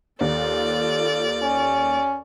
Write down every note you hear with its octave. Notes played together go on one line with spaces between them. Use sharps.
D#2 F4 A4 D5
C#4